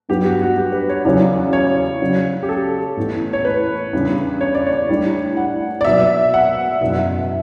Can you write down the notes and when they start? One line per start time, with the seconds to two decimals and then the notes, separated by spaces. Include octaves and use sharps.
0.09 G2 F#3 B3 G4
0.25 F#4
0.41 F#4
0.57 G4
0.72 B4
0.89 C#5
1.04 E2 C#3 F#3 C#4 D5
1.53 C#5
2.01 C#3 F#3 C#4
2.43 G4
2.49 A4
2.97 A1 A2 E3 B3
3.33 C#5
3.45 B4
3.93 E2 C#3 G3 D4
4.41 C#5
4.55 D5
4.67 C#5
4.89 A2 G3 D4
5.37 F#5
5.81 D5
5.85 B2 F#3 B3 E5
6.34 F#5
6.81 F#1 E2 B2 E5
6.90 F#5
6.99 E5